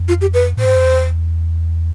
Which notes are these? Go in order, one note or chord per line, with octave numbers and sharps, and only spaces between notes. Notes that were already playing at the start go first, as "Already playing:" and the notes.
Already playing: F2
F4
G4
B4
A2 C5
G2
F2
E2